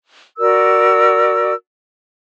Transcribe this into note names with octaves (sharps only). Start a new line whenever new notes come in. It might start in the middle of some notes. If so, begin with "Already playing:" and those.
F#4 A#4 D5 E6